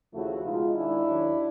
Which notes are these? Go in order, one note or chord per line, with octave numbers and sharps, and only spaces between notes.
D#2 C#3 F3 A3 E4 F#4
B2 G#3 D#4 F4
G#2 D#3 G#3 D4 E4
D#2 D#3 F#3